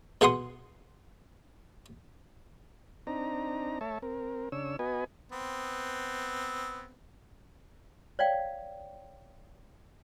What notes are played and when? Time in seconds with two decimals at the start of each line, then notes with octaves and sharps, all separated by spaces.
0.21 B2 G#4 F#5 C6 D#6
3.07 C4 D4 D#4 A#5
3.81 A3 C#5 E5 A5
4.02 C4 A#4
4.52 C#3 D4 C#5 E6
4.79 B3 F#4 B4 D#5 G#5
5.32 B3 C4
8.19 C#5 D5 F5 G5